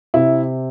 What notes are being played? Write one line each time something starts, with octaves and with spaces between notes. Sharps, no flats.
C3 E4